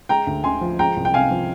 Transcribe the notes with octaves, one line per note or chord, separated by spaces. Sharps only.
G#3 G5 A#5
D2
D3 G#5 C6
F3
G#3 G5 A#5
C2
G5
C3 F5 G#5
F3